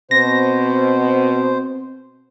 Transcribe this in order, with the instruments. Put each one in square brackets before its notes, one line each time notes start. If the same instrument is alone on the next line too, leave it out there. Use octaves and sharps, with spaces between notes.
[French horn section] B2 [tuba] C4 [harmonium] C5 [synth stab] A#6